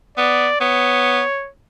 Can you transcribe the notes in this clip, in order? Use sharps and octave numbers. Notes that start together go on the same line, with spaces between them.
B3 D5
B3 C#5